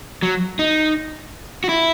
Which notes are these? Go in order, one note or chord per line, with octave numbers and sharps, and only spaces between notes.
F#3
D#4
F#4
E4